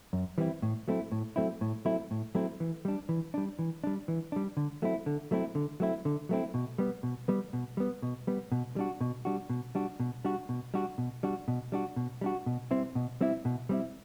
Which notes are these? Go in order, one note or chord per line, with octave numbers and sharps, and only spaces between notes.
F#2
E3 G3 C4 E4
A2
F#3 A3 C4 E4
A2
F#3 A3 C4 E4
A2
F#3 A3 C4 E4
A2
F#3 A3 C4 E4
E3
G3 D4
E3
G3 D4
E3
G3 D4
E3
G3 D4
D3
F#3 A3 C4 E4
D3
F#3 A3 C4 E4
D3
F#3 A3 C4 E4
D3
F#3 A3 C4 E4
B2
G3 B3
B2
G3 B3
B2
G3 B3
B2
G3 B3
B2
G3 D4 F#4
B2
G3 D4 F#4
B2
G3 D4 F#4
B2
G3 D4 F#4
B2
G3 D4 F#4
B2
G3 D4 F#4
B2
G3 D4 F#4
B2
G3 D4 F#4
B2
G3 C4 E4
B2
G3 C4 E4
B2
G3 C4 E4